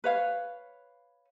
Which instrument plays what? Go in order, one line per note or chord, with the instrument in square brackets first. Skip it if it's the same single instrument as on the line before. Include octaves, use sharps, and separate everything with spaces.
[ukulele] B4 C#5 F5